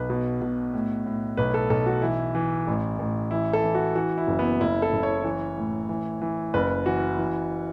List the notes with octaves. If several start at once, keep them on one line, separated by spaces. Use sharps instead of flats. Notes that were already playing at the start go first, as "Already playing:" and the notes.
Already playing: B1 B4
B2
B2
A2
A2
B1 B4
A4
B1 A4
F#4
E3 E4
E3
A1
A1
E3 E4
A4
E3
F#4
E3 F#4
E4
F#1
B3
F#1 E4
A4
F#1
C#5
E3
A2
E3
E3
F#1 B4
E3 F#4
E3